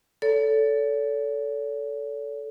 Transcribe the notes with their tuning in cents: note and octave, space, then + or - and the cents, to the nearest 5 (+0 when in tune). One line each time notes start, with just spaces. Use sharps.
A4 +0 C#5 +45